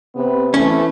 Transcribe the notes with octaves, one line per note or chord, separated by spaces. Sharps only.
C3 B3
E3 A3 C#4